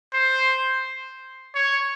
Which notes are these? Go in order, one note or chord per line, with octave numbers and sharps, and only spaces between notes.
C5
C#5